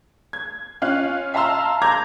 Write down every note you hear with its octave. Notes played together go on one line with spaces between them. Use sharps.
G#6
C#4 F4 F5 F#6
E5 F5 A5 A#5 C6 E6
A#5 D6 G6 G#6 A#6